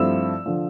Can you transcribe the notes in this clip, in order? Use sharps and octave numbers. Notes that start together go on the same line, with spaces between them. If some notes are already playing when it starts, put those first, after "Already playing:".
Already playing: G2 F3 A3 C4 E4 E6
D3 F3